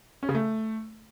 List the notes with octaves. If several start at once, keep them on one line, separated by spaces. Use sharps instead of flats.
C#4
C#3
A3